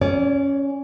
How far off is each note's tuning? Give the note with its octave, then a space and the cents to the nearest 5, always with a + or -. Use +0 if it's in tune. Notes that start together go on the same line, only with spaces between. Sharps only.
C#4 +0 D5 -30